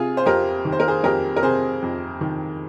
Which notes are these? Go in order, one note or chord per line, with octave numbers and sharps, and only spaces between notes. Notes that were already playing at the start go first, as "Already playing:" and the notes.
Already playing: C3 F4 G#4
C5
F2 G4 A#4
D#3
C5
A#4
G#4 C5
F2 G4 A#4
A#4
C3 G#4 C5
F2
D#3